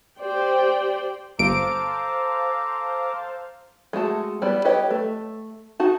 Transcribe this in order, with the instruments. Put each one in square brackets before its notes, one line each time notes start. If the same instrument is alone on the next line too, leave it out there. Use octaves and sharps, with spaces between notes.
[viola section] G4 C5 D5 G5
[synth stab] G1 D7 [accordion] A4 A#5 D6 [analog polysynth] C5 F5 A5
[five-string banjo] G#3 A3 F#4 A5
G3 B3 E4 D5
G4 B4 C#5 D#5 G5
A3
D#4 F#4 A5